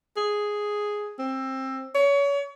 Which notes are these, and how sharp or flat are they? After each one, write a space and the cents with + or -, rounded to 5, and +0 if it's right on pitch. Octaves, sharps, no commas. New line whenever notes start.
G#4 +0
C4 +20
C#5 +30